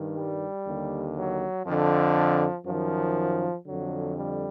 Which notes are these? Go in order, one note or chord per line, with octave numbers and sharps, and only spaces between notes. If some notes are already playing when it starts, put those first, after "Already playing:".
Already playing: G2 D#3
G3
D#2 D3
F#3
F2 D3 F3
F#2 D#3 F3
F2 D3 F#3
G3